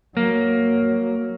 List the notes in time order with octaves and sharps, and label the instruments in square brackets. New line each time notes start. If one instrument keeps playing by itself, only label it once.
[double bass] F#3 [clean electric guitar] A#3